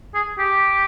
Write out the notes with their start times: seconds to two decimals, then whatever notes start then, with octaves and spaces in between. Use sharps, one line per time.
0.14 G#4
0.38 G4